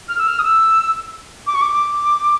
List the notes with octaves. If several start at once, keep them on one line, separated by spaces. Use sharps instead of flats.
F6
E6
F6
D#6
E6
D6
C#6
D6